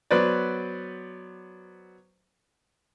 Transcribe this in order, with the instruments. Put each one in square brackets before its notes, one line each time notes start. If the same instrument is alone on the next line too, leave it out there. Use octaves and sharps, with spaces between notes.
[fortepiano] F#3 B3 B4 C5 D5